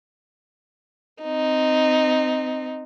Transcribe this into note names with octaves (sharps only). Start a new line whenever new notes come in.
C4 D#4